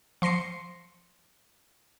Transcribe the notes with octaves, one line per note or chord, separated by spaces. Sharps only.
F3 C6 A#6 C7 C#7